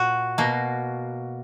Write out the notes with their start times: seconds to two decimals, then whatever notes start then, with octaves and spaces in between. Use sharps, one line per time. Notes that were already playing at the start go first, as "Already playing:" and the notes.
Already playing: A#2 F#4
0.38 B2 A#3